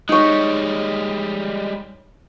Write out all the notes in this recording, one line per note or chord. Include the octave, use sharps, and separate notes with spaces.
G3 G#3 D#4 C#5